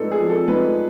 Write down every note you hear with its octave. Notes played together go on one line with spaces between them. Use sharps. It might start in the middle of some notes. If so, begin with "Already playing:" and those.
Already playing: G#2 F3 A4 B4 C5 D5
G#4
F3
A4
G#2 B4